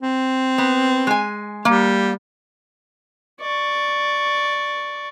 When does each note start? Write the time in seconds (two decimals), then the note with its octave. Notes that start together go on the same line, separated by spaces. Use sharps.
0.01 C4
0.58 B3
1.07 G#3 G#5
1.65 G3 A#3
3.41 D5 C#6